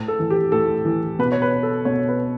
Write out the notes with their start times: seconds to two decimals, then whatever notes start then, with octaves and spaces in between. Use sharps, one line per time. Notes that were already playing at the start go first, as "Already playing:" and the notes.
Already playing: A2
0.08 A4
0.19 E3
0.30 G4
0.52 A2 A4
0.85 E3
1.19 B2 B4
1.32 C#5
1.42 B4
1.63 A4
1.85 B2 C#5
2.08 B4